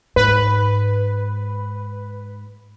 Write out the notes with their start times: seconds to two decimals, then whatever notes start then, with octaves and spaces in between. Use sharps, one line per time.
0.16 G#2 B4